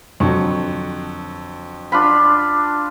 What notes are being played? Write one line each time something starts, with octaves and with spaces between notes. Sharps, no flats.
F2 D3 F#3 C#6
D4 F4 B5